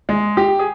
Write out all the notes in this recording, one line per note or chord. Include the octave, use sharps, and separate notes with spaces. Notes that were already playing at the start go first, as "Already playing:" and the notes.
G#3
G4
G#4